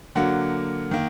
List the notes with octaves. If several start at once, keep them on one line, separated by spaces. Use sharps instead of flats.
D3 F#3 A#3 F#5
D#3 A#3